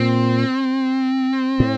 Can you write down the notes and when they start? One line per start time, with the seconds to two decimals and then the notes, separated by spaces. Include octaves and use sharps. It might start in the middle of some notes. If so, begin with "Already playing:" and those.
Already playing: A#2 C4
1.60 A2